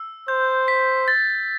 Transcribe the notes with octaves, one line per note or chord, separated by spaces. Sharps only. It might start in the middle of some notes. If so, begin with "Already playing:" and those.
Already playing: E6
C5 G6
B6
A6